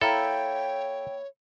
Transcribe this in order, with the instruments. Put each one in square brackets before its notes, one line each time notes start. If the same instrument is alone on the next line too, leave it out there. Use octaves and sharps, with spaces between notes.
[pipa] A#3 E4 [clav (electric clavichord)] A4 [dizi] C#5 [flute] G5